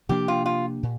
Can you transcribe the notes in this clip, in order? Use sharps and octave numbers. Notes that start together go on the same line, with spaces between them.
C3 F3 A#3 D4 G4
F4
F4
A#2